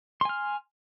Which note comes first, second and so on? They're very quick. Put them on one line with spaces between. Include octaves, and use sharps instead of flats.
C6 G#5 F6